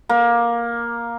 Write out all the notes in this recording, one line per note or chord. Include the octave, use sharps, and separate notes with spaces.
A#3